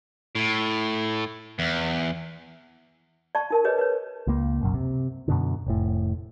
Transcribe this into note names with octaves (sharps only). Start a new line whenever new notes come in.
A2
E2
D5 A5 C#6
D#4 A#4 A5
G#4 B4 C#5 D#5
B4 C#5
C#2 A#3
F#1 B1 F#2
C3
F#2 B2 D3
F1 A2